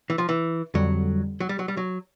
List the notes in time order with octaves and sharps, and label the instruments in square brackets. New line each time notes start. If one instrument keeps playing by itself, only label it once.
[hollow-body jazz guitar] E3
F3
E3
[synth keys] F2 D3 G3 [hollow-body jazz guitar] F#3
[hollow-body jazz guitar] F#3
G3
F#3
G3
F#3